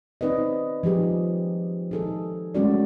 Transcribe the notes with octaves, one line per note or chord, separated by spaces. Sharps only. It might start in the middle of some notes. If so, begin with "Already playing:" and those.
C4 D#4 B4 D5 D#5
F3 D#4 G4 G#4 B4
D#4 G#4 A4
G#3 A3 C#4 F#4 A4 D5